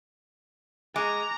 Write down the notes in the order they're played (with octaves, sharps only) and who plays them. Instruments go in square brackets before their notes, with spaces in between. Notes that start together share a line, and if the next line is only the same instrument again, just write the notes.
[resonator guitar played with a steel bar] G#3 [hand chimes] G#5 D6 [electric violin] A#5